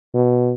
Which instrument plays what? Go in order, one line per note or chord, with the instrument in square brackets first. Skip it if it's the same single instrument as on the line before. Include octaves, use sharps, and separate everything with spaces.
[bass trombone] B2